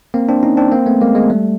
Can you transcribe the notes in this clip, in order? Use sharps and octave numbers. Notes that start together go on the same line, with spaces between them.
A#3 C4
C4 D4
C#4 D#4
C4 D4
A#3 C4
A3 B3
G#3 A#3
G#3 A#3
G3 A3